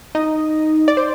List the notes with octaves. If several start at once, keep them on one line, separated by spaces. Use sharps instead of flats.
D#4 D#5
D5
C5